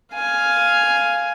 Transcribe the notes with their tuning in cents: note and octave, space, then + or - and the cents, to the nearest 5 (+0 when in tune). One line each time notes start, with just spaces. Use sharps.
F5 +0 G#5 +5